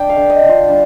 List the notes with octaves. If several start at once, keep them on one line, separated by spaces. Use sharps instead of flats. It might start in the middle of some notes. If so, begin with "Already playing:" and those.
Already playing: D4 G5
F5
D3
D#5
D3
F4
G3 D4